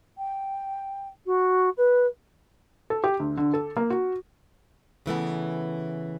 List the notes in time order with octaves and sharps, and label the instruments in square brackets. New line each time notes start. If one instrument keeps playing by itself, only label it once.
[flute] G5
F#4
B4
[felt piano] A4
G4
D2
D3
A4
A#3
F#4
[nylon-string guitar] C#3 E3 A3 B3